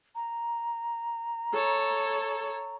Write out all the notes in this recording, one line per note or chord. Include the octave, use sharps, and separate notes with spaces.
A#5
A4 C#5